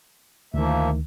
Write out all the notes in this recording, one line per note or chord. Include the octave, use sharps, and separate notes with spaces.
D2 D#3 F3 A#3 E5